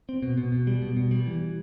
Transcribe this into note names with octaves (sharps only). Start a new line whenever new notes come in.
C4
B2
B2
B2
G3
B2
B2
G3
E3